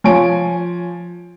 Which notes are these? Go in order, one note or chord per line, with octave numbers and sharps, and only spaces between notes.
F3 C#5 G#5 D7